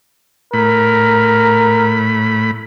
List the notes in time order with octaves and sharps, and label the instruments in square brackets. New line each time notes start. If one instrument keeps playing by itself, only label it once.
[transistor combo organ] A2 B5 [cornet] A#4